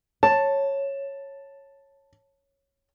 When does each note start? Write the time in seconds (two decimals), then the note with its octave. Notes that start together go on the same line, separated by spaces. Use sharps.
0.23 C#5 A5